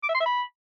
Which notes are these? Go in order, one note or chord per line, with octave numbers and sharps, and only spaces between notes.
D6
E5
C6
E5
B5